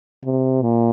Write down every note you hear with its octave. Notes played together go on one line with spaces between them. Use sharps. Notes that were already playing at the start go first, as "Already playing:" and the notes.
C3
A#2